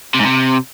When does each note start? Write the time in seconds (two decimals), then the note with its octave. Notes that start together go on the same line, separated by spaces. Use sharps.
0.14 C3
0.19 G#2
0.25 C3